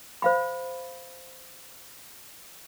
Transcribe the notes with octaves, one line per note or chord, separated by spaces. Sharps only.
C5 F5 B5